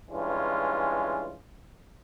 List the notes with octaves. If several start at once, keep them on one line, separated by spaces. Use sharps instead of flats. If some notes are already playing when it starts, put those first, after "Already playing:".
G2 E3 G#3 C#4 F4